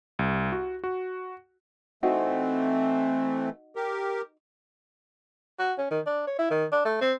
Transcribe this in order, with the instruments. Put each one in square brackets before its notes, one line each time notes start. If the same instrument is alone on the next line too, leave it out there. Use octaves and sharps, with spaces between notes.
[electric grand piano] C2
F#4
F#4
[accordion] E3 A3 [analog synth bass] C4 [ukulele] D#4 F#4
[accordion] G4 A#4
[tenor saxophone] F#4
C#4
D#3
D4
C#5
E4
D#3
D4
A3
C4